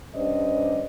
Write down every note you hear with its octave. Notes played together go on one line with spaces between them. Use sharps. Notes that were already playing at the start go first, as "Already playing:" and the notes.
G2 C#4 G4 C5 D5 D#5